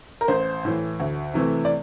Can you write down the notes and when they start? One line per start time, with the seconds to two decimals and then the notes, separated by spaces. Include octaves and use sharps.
0.21 A#4
0.28 A1 C5
0.65 A2 E3
1.00 D2
1.34 C3 E3 A3
1.65 D5